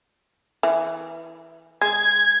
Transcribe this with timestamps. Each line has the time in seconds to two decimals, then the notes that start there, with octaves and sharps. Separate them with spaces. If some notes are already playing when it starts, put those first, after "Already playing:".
0.63 E3
1.81 G#3 G#6